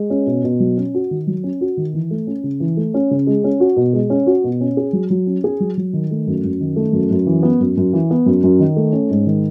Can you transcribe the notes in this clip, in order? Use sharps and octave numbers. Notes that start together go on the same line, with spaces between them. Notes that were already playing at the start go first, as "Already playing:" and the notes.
Already playing: G#3
C#4
B2
B2
F#3
C#4
F#4
D#3
F#3
C#4
F#4
D#3
E3
A3
C#4
C#3
E3
A3
C#4
C#3
G#3
C#4
F#4
B2
G#3
C#4
F#4
B2
C#4
G#4
F#3
F#3
C#4
G#4
F#3
F#3
D#3
A3
F#2
F#2
D#3
A3
F#2
F#2
E3
B3
F#2
F#2
E3
B3
F#2
F#2
D#3
A3
C#4
G#2
D#3